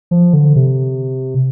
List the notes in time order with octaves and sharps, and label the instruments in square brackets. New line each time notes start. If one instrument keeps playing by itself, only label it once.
[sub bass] F3
D3
C3